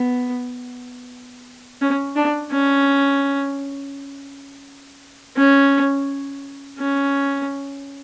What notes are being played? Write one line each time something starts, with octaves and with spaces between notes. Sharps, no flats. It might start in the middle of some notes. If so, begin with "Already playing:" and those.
Already playing: B3
C#4
D4
C#4
C#4
C#4